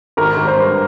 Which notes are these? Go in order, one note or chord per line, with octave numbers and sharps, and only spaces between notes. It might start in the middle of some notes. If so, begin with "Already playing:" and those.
G#1 A#4
G#1
C5
G2